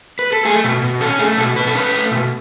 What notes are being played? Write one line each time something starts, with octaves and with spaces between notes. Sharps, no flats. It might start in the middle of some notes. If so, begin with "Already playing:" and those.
B4
A4
A3 G#4
B2
B2
C#4 A4
A3 G#4
B2 A4
B2 B4
A4
C#4 B4
A3
B2